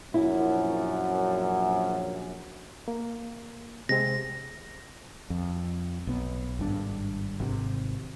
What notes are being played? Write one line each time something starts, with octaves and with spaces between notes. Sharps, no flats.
A#1 F#2 E4
A#3
C3 G#3 C4 A#6
F2
B1 B3
G#1 G2 D4
G#1 C3